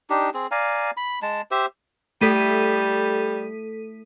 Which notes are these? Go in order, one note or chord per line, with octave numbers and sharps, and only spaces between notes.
D4 D#4 G4
C4 G#4
D5 F5 G#5 A#5
B5
G#3 A5
G4 C5 E5
G3 A3 A4 B6 D#7